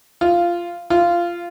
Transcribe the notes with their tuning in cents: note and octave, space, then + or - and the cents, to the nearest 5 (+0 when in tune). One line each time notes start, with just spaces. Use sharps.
F4 -10
F4 -15